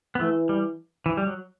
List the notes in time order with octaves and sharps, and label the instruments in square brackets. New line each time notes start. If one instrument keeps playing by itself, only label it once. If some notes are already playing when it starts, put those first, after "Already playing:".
[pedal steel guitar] B3
[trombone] E3 [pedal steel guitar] A3
[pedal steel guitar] G3
E3
G3
F#3